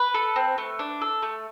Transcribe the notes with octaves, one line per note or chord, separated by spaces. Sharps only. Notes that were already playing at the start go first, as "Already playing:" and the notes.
Already playing: B4
A4
C4
A3
D4
A4
A3